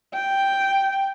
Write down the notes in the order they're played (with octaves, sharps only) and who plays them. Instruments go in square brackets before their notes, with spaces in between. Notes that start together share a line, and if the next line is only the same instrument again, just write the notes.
[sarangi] G5